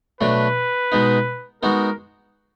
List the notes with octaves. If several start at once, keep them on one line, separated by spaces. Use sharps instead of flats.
B2 F#3 A3 D4 B4
B2 G#3 B3 D#4
G#3 B3 D#4 F#4 A#4